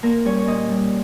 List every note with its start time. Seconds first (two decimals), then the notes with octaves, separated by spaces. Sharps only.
0.03 A#2 A#3 A#4
0.25 G3 C#4 C#5
0.39 C#5
0.47 A#2 D#4 D#5
0.69 G3